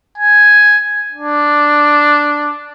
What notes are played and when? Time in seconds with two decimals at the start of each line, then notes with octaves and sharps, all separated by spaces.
0.18 G#5
1.13 D4